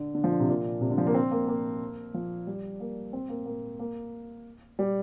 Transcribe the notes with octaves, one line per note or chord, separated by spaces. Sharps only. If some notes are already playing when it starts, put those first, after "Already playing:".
Already playing: D3
D3
F3
D3
C3
A#2
C3
D3
F3
A#3
C4
A#3
A#3
F3
G3
A#3
C4
A#3
A#3
A#3
G3